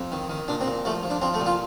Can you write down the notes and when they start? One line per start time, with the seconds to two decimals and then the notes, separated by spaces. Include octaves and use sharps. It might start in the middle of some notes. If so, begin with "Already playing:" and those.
Already playing: F2
0.12 D#3
0.30 D#3
0.48 A#2 D4
0.61 C4
0.66 A#2
0.85 F3 A3
1.03 F3
1.10 D4
1.22 F3 C4
1.34 A3
1.40 A#2
1.46 F4